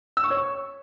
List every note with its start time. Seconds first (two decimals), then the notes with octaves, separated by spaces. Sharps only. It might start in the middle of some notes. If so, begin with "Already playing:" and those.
0.17 E6
0.24 C#6
0.30 C#5
0.37 C#6